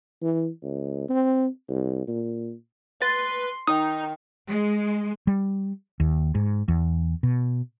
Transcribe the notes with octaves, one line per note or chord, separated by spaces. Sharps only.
E3
C#2
C4
C2
A#2
B4 C6 A6
D#3 D#4 D#6
G#3
G3
D#2
G#2
E2
B2